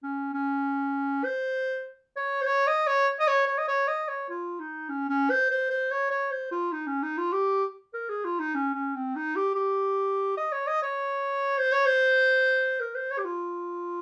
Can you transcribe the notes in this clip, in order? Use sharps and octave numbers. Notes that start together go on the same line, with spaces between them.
C#4
C#4
C5
C#5
C5
C#5
D#5
C#5
D#5
C#5
C#5
D#5
C#5
D#5
C#5
F4
D#4
C#4
C#4
C5
C5
C5
C#5
C#5
C5
F4
D#4
C#4
D#4
F4
G4
A#4
G#4
F4
D#4
C#4
C#4
C4
D#4
G4
G4
D#5
C#5
D#5
C#5
C5
C#5
C5
A#4
C5
C#5
G4
F4